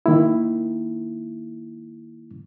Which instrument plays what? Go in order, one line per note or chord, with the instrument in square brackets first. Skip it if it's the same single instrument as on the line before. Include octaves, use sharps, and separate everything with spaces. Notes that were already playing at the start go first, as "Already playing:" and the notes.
[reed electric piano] D#3 A#3 E4